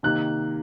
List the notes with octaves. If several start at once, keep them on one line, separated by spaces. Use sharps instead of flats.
C3 D#3 A#3 F#6